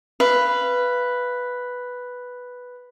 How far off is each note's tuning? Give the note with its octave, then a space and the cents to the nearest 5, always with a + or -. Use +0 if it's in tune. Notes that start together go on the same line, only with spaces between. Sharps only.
B4 +0 F5 -30